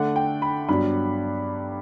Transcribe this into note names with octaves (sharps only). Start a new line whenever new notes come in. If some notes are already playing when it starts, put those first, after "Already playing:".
Already playing: D3 A3 D4 F#5
G5
B5
G2 F#3 B3 D4 B5